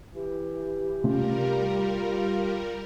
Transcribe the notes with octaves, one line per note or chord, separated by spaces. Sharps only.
E3 G4
C3 G3 A3 C#4 F4 A#4